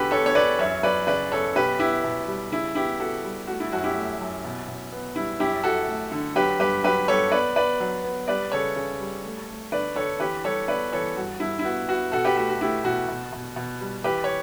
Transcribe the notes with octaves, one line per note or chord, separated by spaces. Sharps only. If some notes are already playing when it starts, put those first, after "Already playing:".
Already playing: E2 D3 F#4 G4 A4 B4
E2 A4 C#5
C#5
E2 B4 D5
F#2 C#5 E5
F#3 B4 D5
C#3 B4 D5
F#2 A4 C#5
B2 G4 B4
B3 E4 G4
B2
G3
C#3 E4
B3 E4 G4
B3 F#4 A4
G3
A3 F#4
E4
F#2 F#4
E4 G4
A3
F#2
B2
B2
B3
G3 E4
F#2 E4 G4
F#2 F#4 A4
A3
D3
F#3 G4 B4
G2 G4 B4
F#3 G4 B4
G2 A4 C#5
B3 B4 D5
B3 B4 D5
F#3
B3
G3 B4 D5
C#3 A4 C#5
C#3
G3
A3
A3
D3 B4 D5
D3 A4 C#5
E3 G4 B4
G3 A4 C#5
B3 B4 D5
E3 A4 C#5
G2 F#4
G2 E4
E4
B3 F#4
B3 F#4
B2 F#4 A4
G4 B4
A3 F#4
F#4
A3 E4 G4
B2 F#4
B2
B2
B2
G3
E3 G4 B4
C#5